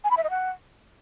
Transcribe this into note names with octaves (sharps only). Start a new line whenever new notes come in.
G#5
B5
E5
D#5
F#5